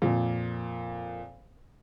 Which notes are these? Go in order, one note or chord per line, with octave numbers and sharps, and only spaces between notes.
F2 A#2